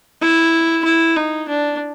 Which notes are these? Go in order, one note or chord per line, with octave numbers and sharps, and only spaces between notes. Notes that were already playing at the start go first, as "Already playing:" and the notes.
E4
E4
D#4
D4